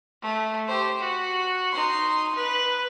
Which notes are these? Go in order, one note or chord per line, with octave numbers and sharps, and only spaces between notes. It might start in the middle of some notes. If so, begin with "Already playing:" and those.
A3
G4 C5
F#4
D#4 C6
B4